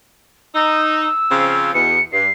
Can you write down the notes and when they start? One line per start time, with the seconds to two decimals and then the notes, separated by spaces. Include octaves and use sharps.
0.55 D#4 E6
1.31 C#3 F3 C4
1.74 E2 B2 C#7
2.13 G2 C7